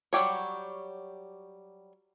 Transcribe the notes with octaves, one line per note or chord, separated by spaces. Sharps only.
F#3 G3 G4 C#5